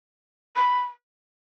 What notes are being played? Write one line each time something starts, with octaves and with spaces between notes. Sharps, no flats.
B5